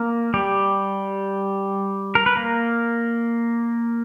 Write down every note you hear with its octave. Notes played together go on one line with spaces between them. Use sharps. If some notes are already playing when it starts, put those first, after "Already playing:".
Already playing: A#3 A#4
G3 G4
A#4
B4
A#3 A#4